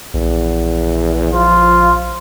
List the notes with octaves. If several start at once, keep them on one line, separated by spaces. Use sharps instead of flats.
A#1 E2
F3 F4